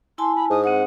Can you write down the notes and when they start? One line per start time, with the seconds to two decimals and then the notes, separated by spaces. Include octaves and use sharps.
0.18 E4 G#5 A5 C6
0.35 B5
0.50 G#2 D#6
0.64 C4 F#5 D#6